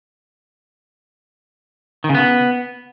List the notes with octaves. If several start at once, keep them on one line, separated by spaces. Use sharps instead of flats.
D#3
C#3
B3